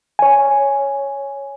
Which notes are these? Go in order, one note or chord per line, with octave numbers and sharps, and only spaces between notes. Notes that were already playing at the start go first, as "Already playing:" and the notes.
C#5 G#5